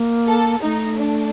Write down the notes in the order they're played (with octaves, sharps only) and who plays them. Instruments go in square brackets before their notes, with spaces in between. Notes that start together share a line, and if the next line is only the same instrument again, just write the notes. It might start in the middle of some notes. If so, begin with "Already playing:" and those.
Already playing: [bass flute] A#3
[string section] A4
[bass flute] A3 [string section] D#4
[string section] D4